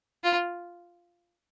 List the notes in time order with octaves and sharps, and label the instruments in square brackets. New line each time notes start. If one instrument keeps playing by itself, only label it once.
[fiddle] F4